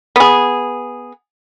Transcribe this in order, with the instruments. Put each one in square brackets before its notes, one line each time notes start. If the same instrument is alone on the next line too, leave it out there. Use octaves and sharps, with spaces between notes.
[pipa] B3 G#4